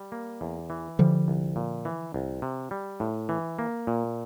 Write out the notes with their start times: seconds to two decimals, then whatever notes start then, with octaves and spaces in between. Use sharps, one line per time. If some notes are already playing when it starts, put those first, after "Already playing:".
Already playing: G3
0.12 A#3
0.41 E2
0.70 E3
0.99 D3 F3 G3
1.28 C2
1.56 A#2
1.85 E3
2.14 C2
2.42 C3
2.71 G3
3.00 A2
3.29 E3
3.59 A#3
3.87 A#2